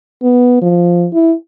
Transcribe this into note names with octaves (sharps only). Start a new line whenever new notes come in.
B3
F3
E4